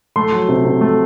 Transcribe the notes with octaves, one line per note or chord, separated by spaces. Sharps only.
A3 C6
F#3
C3
C3
A3